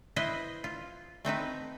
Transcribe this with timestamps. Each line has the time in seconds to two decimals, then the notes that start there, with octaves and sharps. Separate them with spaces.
0.16 E4 B4 C5 D#5
0.64 F4
1.25 A3 C4 D#4 B4